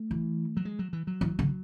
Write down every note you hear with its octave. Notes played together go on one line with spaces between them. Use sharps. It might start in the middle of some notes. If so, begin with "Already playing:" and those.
Already playing: A3
E3
F#3
G#3
F#3
E3
F#3
E3
D3